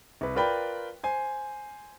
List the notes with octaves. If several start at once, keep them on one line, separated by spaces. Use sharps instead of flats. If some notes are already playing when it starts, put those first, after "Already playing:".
C2 B4
F4 A#4 B4 D5 G5 B5
C5 G#5